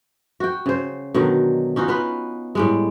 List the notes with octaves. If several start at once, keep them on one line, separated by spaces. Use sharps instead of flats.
F#4 G5
C#3 C5
B2 D3 D#3 F#3
C#4 D#4 F4 F#4
B3 F4 B4
A2 G3 G#3